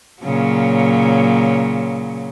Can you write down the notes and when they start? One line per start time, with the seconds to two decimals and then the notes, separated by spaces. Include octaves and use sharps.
0.23 A#2 C#3 F#3